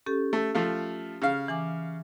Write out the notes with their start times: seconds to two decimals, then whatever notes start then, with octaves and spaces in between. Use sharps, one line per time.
0.06 C#4 G4 A4
0.33 A3
0.55 F3 A3 F5
1.22 C#3 F5
1.48 E3 G#5 D6